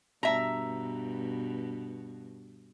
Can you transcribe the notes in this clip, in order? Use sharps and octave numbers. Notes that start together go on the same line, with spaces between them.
G2 B2 E5 A#5